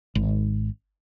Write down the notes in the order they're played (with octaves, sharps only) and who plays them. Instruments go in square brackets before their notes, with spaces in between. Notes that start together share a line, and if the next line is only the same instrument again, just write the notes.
[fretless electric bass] G#1